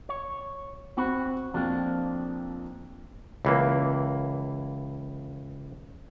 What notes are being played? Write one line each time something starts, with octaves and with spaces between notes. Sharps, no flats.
C#5
C4 F#4 B5
F2 F3 A#3 C4 D4
C#2 E3 A#3